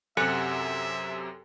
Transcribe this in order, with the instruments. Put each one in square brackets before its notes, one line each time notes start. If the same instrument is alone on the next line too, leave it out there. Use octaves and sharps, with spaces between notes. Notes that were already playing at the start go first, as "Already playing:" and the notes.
[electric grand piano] F#2 C3 [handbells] G4 A4 G#5 [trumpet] E5 [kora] F#5